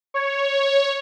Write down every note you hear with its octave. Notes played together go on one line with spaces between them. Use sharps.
C#5